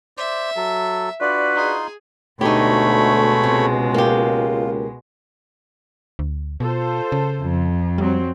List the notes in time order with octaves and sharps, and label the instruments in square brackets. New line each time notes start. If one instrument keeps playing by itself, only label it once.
[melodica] C5 D5 [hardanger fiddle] E5
[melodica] F#3 A4
[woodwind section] D4 F#4 B4 [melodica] F4 D5
[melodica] D#4 F4 C6 [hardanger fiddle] G#4
[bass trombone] D2 [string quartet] B2 G#3 [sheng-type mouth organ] A3 C#5 B5 [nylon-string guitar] D#4 G4
[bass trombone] C#2 [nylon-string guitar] C3
[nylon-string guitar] A#3 G4 [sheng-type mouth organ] F4
[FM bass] D2
[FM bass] B2 [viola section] F4 A4 C5
[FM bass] C#3
[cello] F2
[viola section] F#3 C4 [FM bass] G3